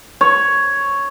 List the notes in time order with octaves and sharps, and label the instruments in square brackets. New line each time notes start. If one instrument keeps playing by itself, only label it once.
[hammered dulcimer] C#5